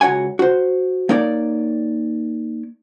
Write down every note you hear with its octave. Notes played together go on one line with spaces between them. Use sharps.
C#2 F#4 C#5 F#5 G#5
F#4 C5
A#3 D#4 A#4 C#5 D5